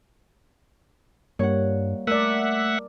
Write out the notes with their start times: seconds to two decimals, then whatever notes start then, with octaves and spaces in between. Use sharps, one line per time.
1.39 G2 G3 A#3 C#5 F#5
2.07 A3 A#4 D5 E5 F#5 E6 D#7